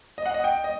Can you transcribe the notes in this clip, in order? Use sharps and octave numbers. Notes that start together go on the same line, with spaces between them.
D#5
F#5
D#5
G5
D#5